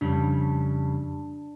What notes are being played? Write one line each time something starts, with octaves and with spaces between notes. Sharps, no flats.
F2 C#3 G3 D4